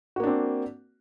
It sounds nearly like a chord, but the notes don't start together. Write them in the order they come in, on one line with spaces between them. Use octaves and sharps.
F#4 A#3 D4 C4